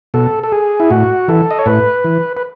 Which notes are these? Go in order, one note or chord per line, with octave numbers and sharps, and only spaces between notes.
B2 A4
A4
G#4
E4
A2 F#4
E3 A4
D#5
C#5
A2 B4
E3
B4